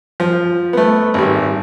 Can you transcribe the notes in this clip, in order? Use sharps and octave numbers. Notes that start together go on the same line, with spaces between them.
F3
A3 B3
G#1 G3